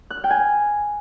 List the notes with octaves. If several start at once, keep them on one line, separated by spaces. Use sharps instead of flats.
F#6
F6
G5
G#5